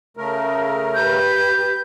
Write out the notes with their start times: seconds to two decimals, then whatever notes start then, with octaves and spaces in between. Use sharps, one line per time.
0.17 C#3 A3 A#4
0.95 G4 B4 G6